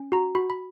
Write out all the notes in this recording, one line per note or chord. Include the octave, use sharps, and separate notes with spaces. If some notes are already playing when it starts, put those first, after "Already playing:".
Already playing: C#4
F#4 A#5
F#4 B5
B5